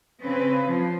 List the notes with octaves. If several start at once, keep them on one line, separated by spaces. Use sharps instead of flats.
C#3 C4 B4
F3